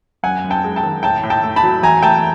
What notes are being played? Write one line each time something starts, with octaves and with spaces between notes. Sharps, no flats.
F#2 F#5 G#5
F#2
G5 A5
G#3
G5 A5
D#3
A2 G5 A5
A2
G5 A5
A3
A5 B5
F#3
E2 G#5 A#5
A3 G5 A5